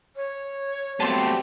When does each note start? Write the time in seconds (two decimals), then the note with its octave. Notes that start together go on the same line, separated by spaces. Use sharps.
0.16 C#5
1.00 F#3 G3 A3 B3 C4 G4 A5 C6